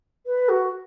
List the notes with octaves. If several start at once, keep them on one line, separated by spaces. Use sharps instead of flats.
B4
F#4